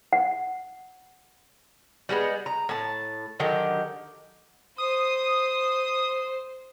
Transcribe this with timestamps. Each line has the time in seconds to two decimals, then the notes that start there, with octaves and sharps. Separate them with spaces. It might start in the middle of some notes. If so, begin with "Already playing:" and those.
0.13 F#5
2.09 G3 G#3 A#3 B3
2.46 A#5
2.69 A2 A5
3.40 D3 D#3 F#3 G4
4.78 C5 D#6